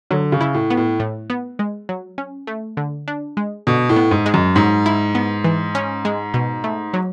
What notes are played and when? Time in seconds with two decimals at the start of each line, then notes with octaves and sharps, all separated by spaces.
0.11 D3 F#3
0.32 C#3
0.41 E4
0.54 A2
0.70 B3
0.77 A2
1.00 A2
1.30 B3
1.59 G#3
1.89 F#3
2.18 C#4
2.47 A3
2.77 D3
3.08 D4
3.37 G#3
3.67 B2 D3
3.89 A2
3.96 B3
4.11 G#2
4.26 G#3
4.34 F#2
4.56 G#2 F#3
4.86 E4
5.15 B3
5.44 E3
5.75 C#4
6.05 G#3
6.34 B2
6.64 A3
6.94 F#3